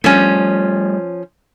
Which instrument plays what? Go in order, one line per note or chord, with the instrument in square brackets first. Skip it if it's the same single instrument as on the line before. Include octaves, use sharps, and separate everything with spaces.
[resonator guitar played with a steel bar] F3 C#4 [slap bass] G3 A3